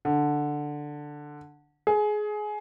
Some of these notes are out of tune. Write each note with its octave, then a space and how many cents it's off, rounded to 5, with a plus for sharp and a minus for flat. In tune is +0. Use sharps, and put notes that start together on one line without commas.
D3 +5
G#4 +20